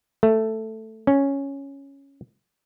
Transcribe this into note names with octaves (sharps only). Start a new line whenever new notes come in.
A3
C#4